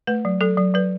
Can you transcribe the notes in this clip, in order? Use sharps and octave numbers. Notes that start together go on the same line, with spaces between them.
A3 B4
F#3
F#3 A4
F#3
F#3 B4